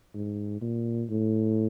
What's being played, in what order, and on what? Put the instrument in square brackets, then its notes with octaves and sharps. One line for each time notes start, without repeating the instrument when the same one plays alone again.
[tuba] G#2
A#2
A2